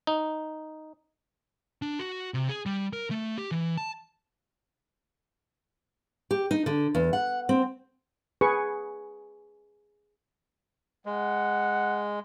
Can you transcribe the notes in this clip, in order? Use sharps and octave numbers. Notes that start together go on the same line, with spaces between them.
D#4
D4
F#4
C3
G#4
G3
A#4
A3
G4
E3
A5
G4
D#4
D3
E2
F#5
C4
G#4 B4 C#6
G#3 F#5